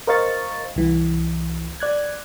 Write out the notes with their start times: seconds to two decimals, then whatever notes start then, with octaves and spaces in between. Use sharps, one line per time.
0.07 A#4 C5 D#5 F5 C#6 A6
0.76 C2 E3
1.80 D5 F#6 G#6